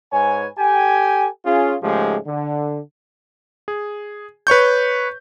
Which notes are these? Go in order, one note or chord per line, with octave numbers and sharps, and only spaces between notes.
G#2 B4 C#5 G#5
G4 A4 G5 G#5
C#4 F4 G#4
G#2 C#3 F3 G#3 A3 G4
D3
G#4
B4 C#5 C#6 G6